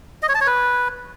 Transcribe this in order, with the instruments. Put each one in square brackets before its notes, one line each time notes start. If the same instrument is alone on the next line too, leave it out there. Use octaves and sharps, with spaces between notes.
[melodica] D#5
C#5
A5
C#5
B4